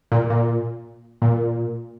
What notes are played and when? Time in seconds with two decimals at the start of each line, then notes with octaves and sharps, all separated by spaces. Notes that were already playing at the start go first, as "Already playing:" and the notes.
0.12 A#2
0.30 A#2
1.22 A#2